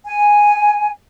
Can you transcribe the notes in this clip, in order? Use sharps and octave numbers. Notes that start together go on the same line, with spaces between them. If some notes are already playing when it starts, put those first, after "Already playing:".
G#5